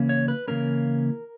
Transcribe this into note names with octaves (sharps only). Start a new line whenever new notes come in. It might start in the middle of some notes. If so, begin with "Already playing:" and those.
Already playing: C#3 E3 A#3 C#4
C#5
B4
C#3 E3 A#3 C#4 A#4